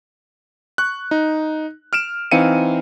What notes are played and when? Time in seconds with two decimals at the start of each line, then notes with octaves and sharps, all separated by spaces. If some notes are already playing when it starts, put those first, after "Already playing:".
0.78 C#6 F#6
1.11 D#4
1.93 F6 D7 E7
2.31 E3 C4 D#4 F5 C#7 D#7